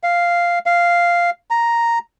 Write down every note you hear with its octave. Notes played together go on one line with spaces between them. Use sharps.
F5
F5
A#5